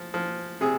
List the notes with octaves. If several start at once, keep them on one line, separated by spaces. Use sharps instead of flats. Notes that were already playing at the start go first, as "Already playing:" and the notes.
Already playing: F3
F3
C3 G#4